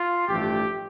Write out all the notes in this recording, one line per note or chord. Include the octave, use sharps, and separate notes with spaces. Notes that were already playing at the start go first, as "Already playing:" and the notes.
Already playing: F4
A1 G2 F3 A3 G4